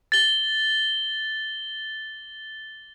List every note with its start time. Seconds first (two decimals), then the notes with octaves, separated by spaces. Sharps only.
0.12 A6 G7